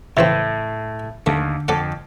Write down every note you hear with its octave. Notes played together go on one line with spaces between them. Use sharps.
A2 C#3 E3 C4 E5
D#2 D3 A3
F2 A4 D5 F#5